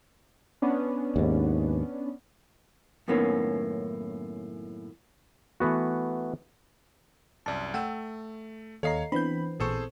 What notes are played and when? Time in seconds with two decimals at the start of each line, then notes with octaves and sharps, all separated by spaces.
0.62 B3 C#4 D4
1.16 D#2 G#2
3.08 F#2 A2 D#3 A#3 B3 C#4
5.60 E3 A3 B3 F#4
7.46 C2 F#2 D5 A5
7.74 A3 F#5 G5 E6
8.83 D#2 A4 C#5 D#5 F5 A#5 C7
9.12 E3 B3 C4 D4 B5 G6
9.60 A1 A#2 G#4 A4 C5 C#6